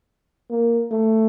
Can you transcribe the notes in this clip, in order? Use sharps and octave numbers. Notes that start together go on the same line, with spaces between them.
A#3
A3